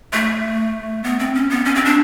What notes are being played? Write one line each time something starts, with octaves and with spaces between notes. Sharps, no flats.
A3
B3
C4
C#4
B3
C#4
C4
D4